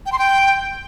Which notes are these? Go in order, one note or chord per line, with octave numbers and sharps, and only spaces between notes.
G5
C6
G5